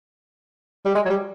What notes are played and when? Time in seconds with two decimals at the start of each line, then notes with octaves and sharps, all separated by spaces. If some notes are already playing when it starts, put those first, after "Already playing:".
0.85 G3
0.95 G#3
1.05 F#3
1.10 G3